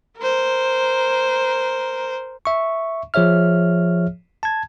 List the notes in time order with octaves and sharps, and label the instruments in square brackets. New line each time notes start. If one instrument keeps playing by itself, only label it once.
[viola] A#4 C5
[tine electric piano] E5 C#6
F3 G#4 C#5 E5 F6
A5 G#6